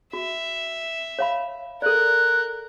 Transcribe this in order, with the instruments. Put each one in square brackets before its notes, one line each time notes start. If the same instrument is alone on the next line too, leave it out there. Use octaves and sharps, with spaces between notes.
[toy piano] F#4 [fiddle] E5
[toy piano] C#5 F5 B5
[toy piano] A4 D5 [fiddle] A#4 [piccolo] F#6